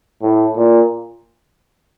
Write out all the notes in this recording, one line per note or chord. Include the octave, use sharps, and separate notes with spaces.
A2
A#2